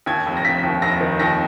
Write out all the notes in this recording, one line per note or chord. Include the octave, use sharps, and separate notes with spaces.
D#2 G#6
F1
A#6
F1 B6
D#2
F1 A#6
D#3
D#2 A#6